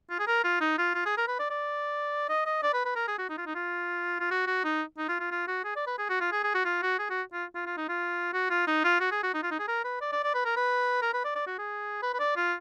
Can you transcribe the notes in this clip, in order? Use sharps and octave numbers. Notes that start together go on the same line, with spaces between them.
F4
G#4
A#4
F4
D#4
F4
F4
G#4
A#4
B4
D5
D5
D#5
D#5
D5
B4
B4
A#4
G#4
F#4
D#4
F4
D#4
F4
F4
F#4
F#4
D#4
D#4
F4
F4
F4
F#4
G#4
D5
B4
G#4
F#4
F4
G#4
G#4
F#4
F4
F#4
G#4
F#4
F4
F4
F4
D#4
F4
F#4
F4
D#4
F4
F#4
G#4
F#4
D#4
F4
D#4
G#4
A#4
B4
D5
D5
D5
B4
A#4
B4
A#4
B4
D5
D5
F#4
G#4
B4
B4
D5
F4